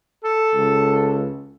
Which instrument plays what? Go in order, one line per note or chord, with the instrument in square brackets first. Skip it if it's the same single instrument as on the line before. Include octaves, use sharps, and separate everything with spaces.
[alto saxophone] A4
[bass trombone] C#2